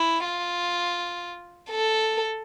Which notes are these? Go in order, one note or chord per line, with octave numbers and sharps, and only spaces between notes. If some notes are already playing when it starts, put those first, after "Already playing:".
Already playing: E4
F4
A4